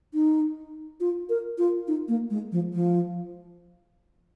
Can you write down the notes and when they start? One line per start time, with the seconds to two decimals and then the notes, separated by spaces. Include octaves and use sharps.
0.14 D#4
1.00 F4
1.29 A#4
1.58 F4
1.88 D#4
2.08 A#3
2.30 G#3
2.52 F3
2.73 F3